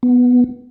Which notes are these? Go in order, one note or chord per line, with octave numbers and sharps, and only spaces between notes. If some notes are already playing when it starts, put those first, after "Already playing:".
B3